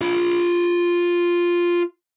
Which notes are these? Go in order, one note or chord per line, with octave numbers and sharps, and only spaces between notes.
F4 B5